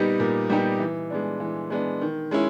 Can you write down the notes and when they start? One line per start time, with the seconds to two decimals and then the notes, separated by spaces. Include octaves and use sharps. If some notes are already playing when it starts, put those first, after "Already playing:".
Already playing: A#2 G3 B3 D#4 G4
0.20 A#2
0.50 G3 B3 D#4 G4
0.79 E3
1.10 G#3 B3 D4
1.40 E3
1.70 G#3 B3 D4
2.01 D#3
2.31 G#3 C#4 E4